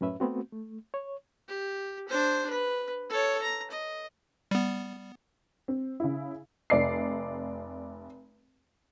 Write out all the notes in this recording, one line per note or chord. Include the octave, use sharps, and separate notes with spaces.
F#2 A2 C#4 B4 E5
A3 B3 C4 F#4
A3
C#5
G4
D4 C5
B4
A4 C#5
A#5
D#5
G3 B3
C4
C#3 E4
F1 D5 C7